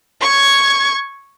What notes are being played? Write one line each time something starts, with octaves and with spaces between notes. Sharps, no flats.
C#6 G#6